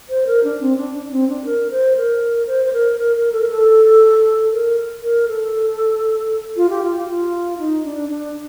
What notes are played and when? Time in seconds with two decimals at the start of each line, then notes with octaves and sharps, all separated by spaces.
0.09 C5
0.27 A#4
0.44 D4
0.61 C4
0.77 D4
0.95 D4
1.05 D4
1.12 C4
1.29 D4
1.45 A#4
1.71 C5
1.97 A#4
2.47 C5
2.65 C5
2.73 A#4
2.99 A#4
3.16 A#4
3.32 A4
3.41 A#4
3.49 A4
4.52 A#4
5.03 A#4
5.28 A4
6.57 F4
6.70 G4
6.82 F4
6.95 G4
7.09 F4
7.59 D#4
7.84 D4
8.09 D4